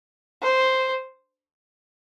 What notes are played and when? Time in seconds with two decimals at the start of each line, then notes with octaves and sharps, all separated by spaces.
0.42 C5